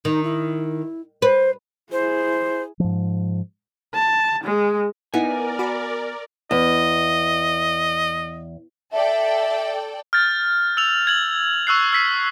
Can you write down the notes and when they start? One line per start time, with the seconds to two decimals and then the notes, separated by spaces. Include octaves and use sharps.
0.05 D#3 D#4
0.24 E4
1.22 B4 C5
1.92 E4 G#4 C5
2.80 G#2 F3
3.95 A5
4.44 G#3
5.14 B3 D#4 E4 A#4 D5 G#5
5.59 F#4 B5
6.51 E2 D#5
8.92 A4 D5 E5 G5
10.13 F6 G6 A6
10.77 E6 F7
11.07 G#6 F#7
11.67 C#6 E6 F#6 C7
11.93 E6 B6 C7